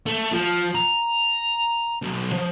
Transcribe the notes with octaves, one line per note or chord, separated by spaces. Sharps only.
A3
F3
A#5
B1
F3